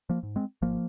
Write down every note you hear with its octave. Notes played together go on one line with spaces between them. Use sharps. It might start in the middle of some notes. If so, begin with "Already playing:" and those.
F3 A#3
G#2
G#3 C4
G#1 F3 A#3